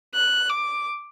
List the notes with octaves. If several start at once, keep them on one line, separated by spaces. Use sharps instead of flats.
F#6
D6